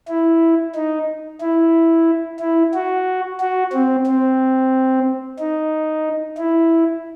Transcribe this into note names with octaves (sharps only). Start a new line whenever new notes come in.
E4
D#4
E4
E4
F#4
F#4
C4
C4
D#4
E4